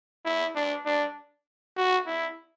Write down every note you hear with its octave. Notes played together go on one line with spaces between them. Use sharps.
E4
D4
D4
F#4
E4